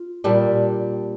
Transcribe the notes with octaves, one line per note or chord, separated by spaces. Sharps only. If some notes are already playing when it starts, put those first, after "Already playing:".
Already playing: F4
A#2 G3 D4